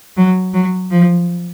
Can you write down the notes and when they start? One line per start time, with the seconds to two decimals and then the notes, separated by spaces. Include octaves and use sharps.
0.17 F#3
0.54 F#3
0.91 F3